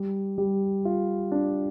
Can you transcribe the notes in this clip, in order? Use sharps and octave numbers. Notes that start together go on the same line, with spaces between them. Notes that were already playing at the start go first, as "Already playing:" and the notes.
Already playing: G3
G3
F4
D4